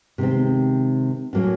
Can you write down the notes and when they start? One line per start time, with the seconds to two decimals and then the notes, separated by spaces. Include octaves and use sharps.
0.18 C3 D#3 G#3 C4
1.33 A2 F#3 A#3 C#4